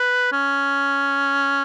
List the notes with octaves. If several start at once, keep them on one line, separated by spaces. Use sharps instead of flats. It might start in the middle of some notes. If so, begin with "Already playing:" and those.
Already playing: B4
C#4